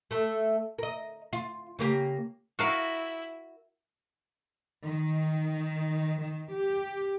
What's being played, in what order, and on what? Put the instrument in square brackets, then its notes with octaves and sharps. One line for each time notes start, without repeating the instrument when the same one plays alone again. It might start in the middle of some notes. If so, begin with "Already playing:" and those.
[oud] A3 A4
A#4 D#5
F4
C#3 A#3 G4
[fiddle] E4 [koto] F#4 A#4 F5
[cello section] D#3
D#3
G4